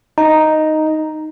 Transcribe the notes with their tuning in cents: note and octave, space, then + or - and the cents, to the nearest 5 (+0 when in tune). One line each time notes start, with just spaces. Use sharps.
D#4 +0 A#5 +0